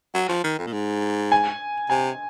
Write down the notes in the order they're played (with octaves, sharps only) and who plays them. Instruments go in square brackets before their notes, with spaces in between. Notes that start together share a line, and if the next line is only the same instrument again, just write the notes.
[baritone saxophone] F#3
F3
D#3
F2
A#2
G#2
[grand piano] G#5
[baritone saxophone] C3 [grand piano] G#5